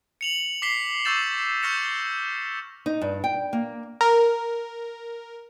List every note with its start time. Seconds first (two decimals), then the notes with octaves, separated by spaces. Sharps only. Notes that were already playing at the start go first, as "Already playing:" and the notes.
0.21 C#7 F7 F#7
0.62 D6 B6 C7 G7
1.05 C#6 D6 E6 G6 A6 E7
1.63 C#6 F6 G6 A#6 C#7 E7
2.86 D#4
3.01 G2
3.24 G5
3.53 A#3
4.01 A#4